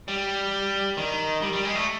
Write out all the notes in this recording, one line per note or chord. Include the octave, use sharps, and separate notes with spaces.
G3
D#3
G3
G3
G#3
A3